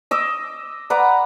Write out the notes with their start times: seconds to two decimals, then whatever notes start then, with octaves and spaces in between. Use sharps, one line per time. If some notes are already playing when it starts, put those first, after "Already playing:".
0.11 D#5 D6 E6
0.90 B4 D5 F#5 A#5